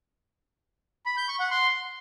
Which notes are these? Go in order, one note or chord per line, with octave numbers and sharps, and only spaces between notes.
B5
G6
C#6
F#5
C6